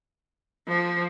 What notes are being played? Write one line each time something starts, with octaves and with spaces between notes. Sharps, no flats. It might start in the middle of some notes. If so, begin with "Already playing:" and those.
F3